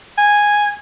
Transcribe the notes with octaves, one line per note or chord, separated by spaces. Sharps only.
G#5